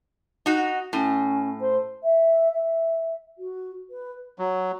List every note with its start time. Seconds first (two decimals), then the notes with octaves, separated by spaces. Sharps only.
0.46 D#4 F#4
0.93 A2 C#4
1.60 C5
2.03 E5
2.53 E5
3.38 F#4
3.90 B4
4.39 F#3